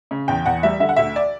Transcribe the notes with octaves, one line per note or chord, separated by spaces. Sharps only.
C#3
E2 G5
E2 F#5
G3 E5
D3 E5
F#5
D2 E5
D5